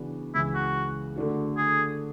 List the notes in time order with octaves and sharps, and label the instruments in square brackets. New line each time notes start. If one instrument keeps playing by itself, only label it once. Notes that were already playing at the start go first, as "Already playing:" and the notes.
Already playing: [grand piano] C#3 E3 B3 D4 F#4
[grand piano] C#2 C#3 E3 [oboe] E4
[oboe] F#4
[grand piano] D3 A3 D4 F#4
[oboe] G#4